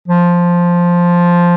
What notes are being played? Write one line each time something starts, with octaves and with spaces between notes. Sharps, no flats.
F3